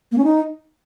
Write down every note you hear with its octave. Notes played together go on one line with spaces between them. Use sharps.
A#3
C#4
D#4